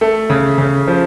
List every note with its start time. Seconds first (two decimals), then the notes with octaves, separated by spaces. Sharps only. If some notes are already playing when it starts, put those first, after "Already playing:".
0.01 A3
0.30 C#3
0.58 C#3
0.88 F3